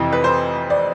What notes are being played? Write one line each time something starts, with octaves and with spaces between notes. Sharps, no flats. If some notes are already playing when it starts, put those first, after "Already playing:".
Already playing: F2 C3 E3
B4
C5
D5